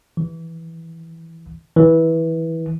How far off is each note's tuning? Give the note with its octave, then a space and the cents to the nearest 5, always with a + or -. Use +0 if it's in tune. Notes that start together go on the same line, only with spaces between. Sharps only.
E3 -5
E3 -15